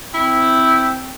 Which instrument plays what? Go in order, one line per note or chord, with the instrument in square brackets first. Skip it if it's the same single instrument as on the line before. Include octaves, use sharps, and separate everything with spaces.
[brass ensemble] C4 G5 [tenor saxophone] E4